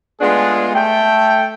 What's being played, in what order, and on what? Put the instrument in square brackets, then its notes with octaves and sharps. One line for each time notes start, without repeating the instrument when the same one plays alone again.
[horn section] G#3 A3 B3 D4 F4 G#4
A3 G5